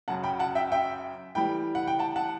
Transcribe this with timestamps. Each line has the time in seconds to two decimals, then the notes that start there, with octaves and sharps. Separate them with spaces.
0.08 F#2 C#3 F#3 F#5 A5
0.23 G5 B5
0.39 F#5 A5
0.55 E5 G5
0.72 E5 G5
1.35 A2 E3 G3 G5 B5
1.75 F#5
1.87 G5
1.99 F#5 A5
2.16 F#5 A5